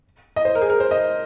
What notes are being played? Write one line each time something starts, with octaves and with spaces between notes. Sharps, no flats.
D#5
C5
A#4
G#4
A#4
C5
D#5